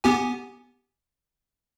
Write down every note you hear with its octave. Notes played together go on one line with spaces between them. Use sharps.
B3 G4 G#5